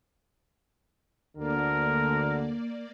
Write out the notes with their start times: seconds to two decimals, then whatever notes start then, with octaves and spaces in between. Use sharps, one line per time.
1.38 D2 D3 A#3 A#4 D5